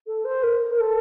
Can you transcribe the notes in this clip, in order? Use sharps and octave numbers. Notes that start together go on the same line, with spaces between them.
A4
C5
A#4
A#4
A4